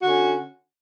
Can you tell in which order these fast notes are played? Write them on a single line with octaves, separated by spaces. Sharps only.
F#4 D3 C#4